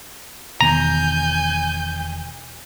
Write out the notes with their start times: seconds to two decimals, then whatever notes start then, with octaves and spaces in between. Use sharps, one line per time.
0.61 E1 D#3 B3 G#5 A#5 G6